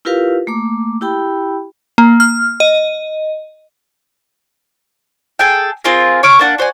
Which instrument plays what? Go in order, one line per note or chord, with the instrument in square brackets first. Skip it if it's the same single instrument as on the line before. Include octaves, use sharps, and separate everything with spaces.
[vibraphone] E4 F4 G4 A#4 B4 F5
A3 A#3 D6
E4 G4 G5 B5
[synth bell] A#3
F6
D#5
[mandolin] G#4 A4 G5
C4 F4 G#4 A#4
C#5 C#6 D6 F6
A#3 D4 F#5
F#4 C5 D5 G#5